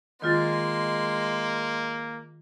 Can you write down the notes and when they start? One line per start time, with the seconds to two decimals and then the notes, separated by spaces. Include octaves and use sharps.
0.22 D#3 G#3 A#3 F4 C6 A6